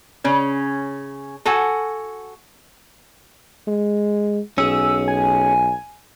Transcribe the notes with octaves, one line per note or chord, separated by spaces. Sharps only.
C#3 C#4
F#4 A4 F#5 G#5
G#3
B1 C#4 G#4 E6
G#5